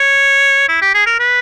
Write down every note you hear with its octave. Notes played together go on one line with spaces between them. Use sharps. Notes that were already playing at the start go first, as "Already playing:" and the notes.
Already playing: C#5
E4
G4
G#4
A#4
B4